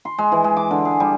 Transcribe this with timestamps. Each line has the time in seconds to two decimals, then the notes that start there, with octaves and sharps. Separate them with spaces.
0.05 C6
0.18 G#3
0.32 E3
0.44 G#3
0.57 D6
0.71 D3
0.85 G#4
1.00 G3